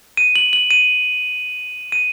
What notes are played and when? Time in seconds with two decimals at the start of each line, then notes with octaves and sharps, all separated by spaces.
0.17 D#7
0.36 F#7
0.53 F#7
0.71 D#7
1.92 D#7